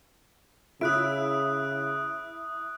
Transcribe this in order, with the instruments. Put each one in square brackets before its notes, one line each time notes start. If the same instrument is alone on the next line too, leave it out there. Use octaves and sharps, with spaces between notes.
[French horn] C#3 [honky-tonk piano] E4 [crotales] D#6 F#6 D7